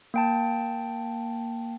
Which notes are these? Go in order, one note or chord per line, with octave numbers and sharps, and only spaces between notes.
A#3 G5 A5